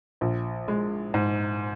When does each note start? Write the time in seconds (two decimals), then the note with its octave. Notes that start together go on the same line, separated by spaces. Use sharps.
0.21 A#1
0.68 G#3
1.14 G#2